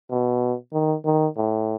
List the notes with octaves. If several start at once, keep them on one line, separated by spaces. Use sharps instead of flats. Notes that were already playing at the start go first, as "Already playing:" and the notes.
B2
D#3
D#3
A2